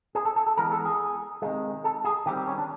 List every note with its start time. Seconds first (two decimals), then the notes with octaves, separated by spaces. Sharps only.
0.15 G#4
0.25 A4
0.36 A4
0.47 A4
0.57 E3 G#3 B3 A#4
0.72 A4
0.85 G#4
1.42 C3 D#3 G#3
1.84 A4
2.05 G#4
2.26 D#3 G3 C4 G4
2.37 G4
2.47 C#4
2.58 D4